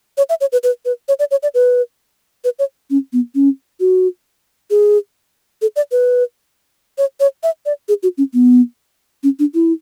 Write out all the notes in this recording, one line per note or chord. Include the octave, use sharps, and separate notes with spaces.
C#5
E5
C#5
B4
B4
B4
C#5
D5
C#5
D5
B4
B4
C#5
C#4
B3
C#4
F#4
G#4
A4
D5
B4
C#5
C#5
E5
D5
G#4
F#4
C#4
B3
C#4
D4
E4